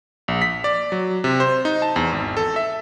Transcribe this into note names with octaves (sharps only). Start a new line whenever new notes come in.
A#1
B6
D5
F#3
C3
C5
D#4
A5
E2
G#1
A4
E5